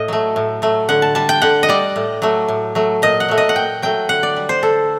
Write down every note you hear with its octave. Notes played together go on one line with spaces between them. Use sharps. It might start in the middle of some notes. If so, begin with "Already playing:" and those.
Already playing: A2 D#5
F#3 A3
A2
F#3 A3
D3 F#5
A5
G3 A5
G5
D3 F#5
D#5
G3 D5
A2
F#3 A3
A2
F#3 A3
A#2 D#5
F#5
F#3 A3
D#5
F#5
A#2 G5
F#3 A3 G5
D3 F#5
D5
G3
C5
D3 A4